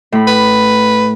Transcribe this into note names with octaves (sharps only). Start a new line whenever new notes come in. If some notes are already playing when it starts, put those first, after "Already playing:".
A2 B5
B4